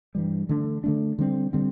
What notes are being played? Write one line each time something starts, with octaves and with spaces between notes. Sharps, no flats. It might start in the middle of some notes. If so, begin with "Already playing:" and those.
G2 E3 G3
D3 A3 D4
D3 A3 D4
D3 G3 C4
D3 G3 C4